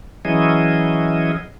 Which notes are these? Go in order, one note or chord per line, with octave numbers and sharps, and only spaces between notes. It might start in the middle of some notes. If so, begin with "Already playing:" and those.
E3 F#3 C#4 E4 G#4 D#5